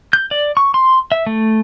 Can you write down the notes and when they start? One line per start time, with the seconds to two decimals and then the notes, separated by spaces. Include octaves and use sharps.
0.13 G6
0.31 D5
0.57 C#6
0.74 C6
1.12 E5
1.27 A3